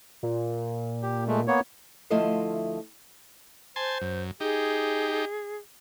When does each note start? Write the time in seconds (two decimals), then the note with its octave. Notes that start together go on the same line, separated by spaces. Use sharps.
0.23 A#2
1.02 G4
1.27 G#3 A3
1.48 A#3 B3 C#5
2.10 D2 F3 A3 E4 D#5 F5
3.76 C5 G#5 A5 C6
4.01 F#2
4.40 D#4 G4 G#4